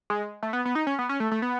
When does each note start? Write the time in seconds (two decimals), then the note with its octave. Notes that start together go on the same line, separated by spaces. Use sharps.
0.10 G#3
0.43 A3
0.53 B3
0.65 B3
0.75 D#4
0.87 C#4
0.99 B3
1.09 C#4
1.20 A3
1.31 A3
1.42 B3